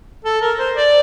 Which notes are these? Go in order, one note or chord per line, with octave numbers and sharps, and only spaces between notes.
A4
A#4
C5
D5